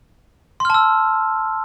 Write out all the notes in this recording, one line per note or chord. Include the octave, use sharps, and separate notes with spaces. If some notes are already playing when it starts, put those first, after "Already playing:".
A5 C6 E6 F6